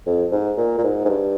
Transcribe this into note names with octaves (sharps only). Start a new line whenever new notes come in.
F2
G#2
A#2
A#2
G#2
G#2
G2